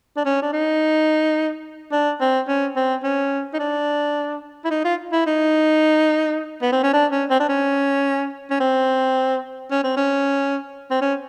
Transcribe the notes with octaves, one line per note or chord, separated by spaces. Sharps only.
D4
C#4
D4
D#4
D4
C4
C#4
C4
C#4
D#4
D4
E4
D#4
F4
E4
D#4
B3
C4
C#4
D4
C#4
C4
D4
C#4
C#4
C4
C#4
C4
C#4
C4
C#4